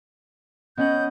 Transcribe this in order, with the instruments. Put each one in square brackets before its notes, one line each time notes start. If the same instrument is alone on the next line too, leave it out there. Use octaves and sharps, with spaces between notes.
[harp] B3 C#4 F#5 [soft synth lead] D#5 [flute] G6